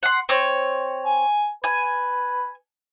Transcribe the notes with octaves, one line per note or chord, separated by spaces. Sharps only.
F#5 C6
C4 C#5
G#5
B4 G#5